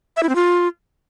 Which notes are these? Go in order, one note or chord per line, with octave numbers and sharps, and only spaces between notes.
E5
E4
C4
F4